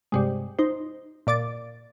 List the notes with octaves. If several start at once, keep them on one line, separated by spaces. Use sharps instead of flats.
G2 C3 G#3
D#4 C5
A#2 D5 D6 A6